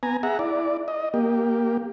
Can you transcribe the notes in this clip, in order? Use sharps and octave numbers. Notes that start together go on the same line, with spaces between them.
B3 G#5 A#5
G#4 E5 F#5 A#5
E4 D5
D#5
A#3 G4